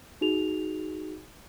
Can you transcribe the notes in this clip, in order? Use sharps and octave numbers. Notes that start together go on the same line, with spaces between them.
D#4 F#4 G#4 F7